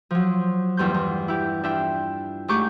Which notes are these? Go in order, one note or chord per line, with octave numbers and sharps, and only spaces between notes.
F3 F#3
E2 G2 C6 G6
E2
E4 G4
D4 E4 F4 E5 G5
G#2 A3 G4 C#6 D6 G6